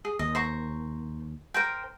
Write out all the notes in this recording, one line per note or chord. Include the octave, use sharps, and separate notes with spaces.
G#4
D#2 D#5
C5 A#5 C#6
A#4 C5 G5